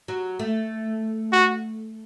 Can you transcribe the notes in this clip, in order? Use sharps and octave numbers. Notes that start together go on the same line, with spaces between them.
F#3
A3
F#4